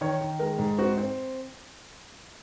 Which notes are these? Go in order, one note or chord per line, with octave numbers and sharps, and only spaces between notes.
D#3 C#5
D#3
G#3 A#4
G#2
C4 F#4
C4